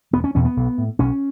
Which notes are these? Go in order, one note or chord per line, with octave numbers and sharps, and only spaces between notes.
E1 B3
C#4
E2 B2 C#4
B3
B1
A2
B1 C#4